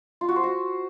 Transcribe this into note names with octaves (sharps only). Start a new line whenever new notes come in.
F4
F#4
C5
F#4